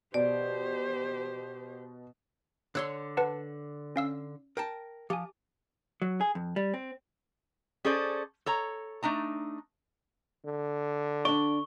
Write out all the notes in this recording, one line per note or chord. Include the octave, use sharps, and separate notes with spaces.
B2 G4 C5 D5
D3 C#5 C6 E6 F#6
B4 F#5 A5
C#4 F5 E6
A#4 G5 A5
F3 G4 G#5
F#3
G#4
F2
G3
C4
C#4 G#4 A4 C5 D5
A4 C#5 A#5
A3 D4 D#4 A#5
D3
D4 D5 C#6